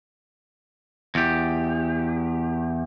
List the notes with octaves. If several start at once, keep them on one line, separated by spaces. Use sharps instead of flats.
E2 G4